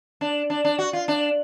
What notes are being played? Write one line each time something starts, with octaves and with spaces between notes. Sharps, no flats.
D4
D4
D4
F#4
F4
D4